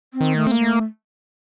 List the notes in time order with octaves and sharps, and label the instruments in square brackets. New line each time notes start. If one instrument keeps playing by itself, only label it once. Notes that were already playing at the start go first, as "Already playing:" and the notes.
[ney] C4
[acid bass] D#3
[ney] A3
[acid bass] C4
A#3
[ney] A3